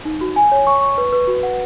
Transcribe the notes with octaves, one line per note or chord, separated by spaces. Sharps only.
D#4
F#4
G#5
C#5
C#6
C#6
B4
B4
F#4
F#5